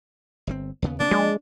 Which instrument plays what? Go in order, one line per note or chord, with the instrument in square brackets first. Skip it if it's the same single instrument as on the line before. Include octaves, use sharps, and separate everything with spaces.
[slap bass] G1 B2 C4
D#2 C#3 B3
[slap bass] C3 A#3 B3 [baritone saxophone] D4
[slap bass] F3 A#3 [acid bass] G#3